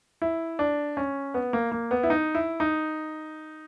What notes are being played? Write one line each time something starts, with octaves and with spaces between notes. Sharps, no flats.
E4
D4
C#4
B3
A#3
A#3
B3
E4
D#4
E4
D#4